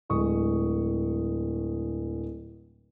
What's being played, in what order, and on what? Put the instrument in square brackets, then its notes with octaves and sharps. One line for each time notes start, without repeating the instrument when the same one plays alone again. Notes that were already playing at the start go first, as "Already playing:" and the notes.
[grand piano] D1 G#3 C#6 D#6